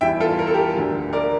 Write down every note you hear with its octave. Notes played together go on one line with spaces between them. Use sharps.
E2 E3 G3 E5 G5
F4 A4
A#4
A4
G4 A#4
D2 D3 F3
A#4 D5